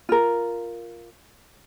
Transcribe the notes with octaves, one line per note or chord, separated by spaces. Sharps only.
F4 A#4